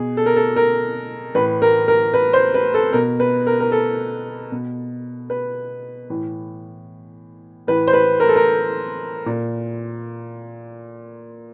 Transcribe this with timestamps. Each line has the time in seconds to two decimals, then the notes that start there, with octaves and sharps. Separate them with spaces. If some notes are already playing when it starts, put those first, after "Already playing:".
Already playing: B2 G#4
0.17 A4
0.26 A#4
0.36 A4
0.56 A#4
1.35 A2 E3 B4
1.62 A#4
1.88 A#4
2.14 B4
2.33 C5
2.54 B4
2.74 A4
2.93 B2 A#4
3.20 B4
3.47 A#4
3.60 A#4
3.72 A4
4.52 B2
5.30 B4
6.10 A2 E3
7.67 A2 E3 B4
7.87 C5
7.93 B4
8.20 A#4
8.28 A4
8.36 A#4
9.26 A#2